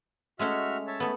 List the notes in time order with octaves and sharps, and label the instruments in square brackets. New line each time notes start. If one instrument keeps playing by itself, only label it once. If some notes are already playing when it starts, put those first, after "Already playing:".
[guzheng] G#3 A3 C#4 [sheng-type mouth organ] F#4 E5 F6
[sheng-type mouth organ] C#5 E5 A5
[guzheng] A3 B3